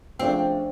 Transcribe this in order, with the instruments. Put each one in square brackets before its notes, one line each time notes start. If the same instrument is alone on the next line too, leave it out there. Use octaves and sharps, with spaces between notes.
[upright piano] C#3 F3 A3 D4 [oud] C4